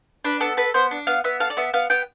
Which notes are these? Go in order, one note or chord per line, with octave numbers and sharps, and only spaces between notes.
D4 B4
B3 A4
A4 B4
B3 C5
D4
B3 F5
B3 E5
A4 F5
D5
B3 E5
B3 F5
B3 G5